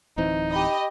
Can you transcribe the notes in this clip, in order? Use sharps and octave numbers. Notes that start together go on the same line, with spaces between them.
D1 E3 C4 D#4
G4 D#5 B5